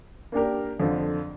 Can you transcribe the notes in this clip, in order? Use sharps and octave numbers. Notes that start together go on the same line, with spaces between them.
A#3 D4 G4 A#4
F2 D3 F3